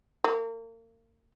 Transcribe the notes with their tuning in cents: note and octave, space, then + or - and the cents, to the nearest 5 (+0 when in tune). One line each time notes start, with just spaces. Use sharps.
A#3 -35